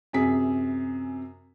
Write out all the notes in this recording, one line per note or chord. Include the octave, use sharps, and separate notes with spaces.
F#2 C3 G#4 B6